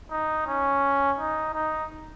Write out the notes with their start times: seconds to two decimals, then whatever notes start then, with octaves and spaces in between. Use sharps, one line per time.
0.11 D#4
0.47 C#4
1.18 D#4
1.54 D#4